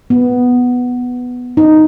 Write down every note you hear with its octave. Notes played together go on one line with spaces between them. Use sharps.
B3
D#4